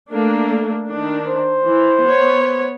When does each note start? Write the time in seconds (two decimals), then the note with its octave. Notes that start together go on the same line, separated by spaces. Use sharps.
0.11 A3 A#3 D4
0.88 D#3 D4
1.27 C5
1.69 E3
2.06 B3 C#5